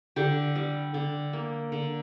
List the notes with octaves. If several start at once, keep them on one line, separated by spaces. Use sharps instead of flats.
D3 G4
G3
D3
A#3
D3